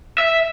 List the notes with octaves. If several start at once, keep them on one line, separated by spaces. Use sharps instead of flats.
E5